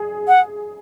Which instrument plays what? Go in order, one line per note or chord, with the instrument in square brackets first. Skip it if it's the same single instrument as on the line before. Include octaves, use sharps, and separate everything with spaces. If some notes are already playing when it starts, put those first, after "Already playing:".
Already playing: [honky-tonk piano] G#4
[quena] F#5